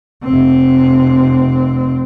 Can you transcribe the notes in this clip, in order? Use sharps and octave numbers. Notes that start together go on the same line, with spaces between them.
F1 C4